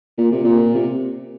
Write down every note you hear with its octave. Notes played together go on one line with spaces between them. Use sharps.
A#2
C3
A#2
C3